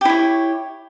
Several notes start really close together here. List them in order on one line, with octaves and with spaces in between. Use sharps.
G4 E4 C#5